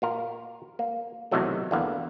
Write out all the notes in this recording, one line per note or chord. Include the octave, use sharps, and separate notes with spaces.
A#2 F4 A#4
A#3
B1 C3 D#3 E3 F#3 A3
E2 D3 A#3 B3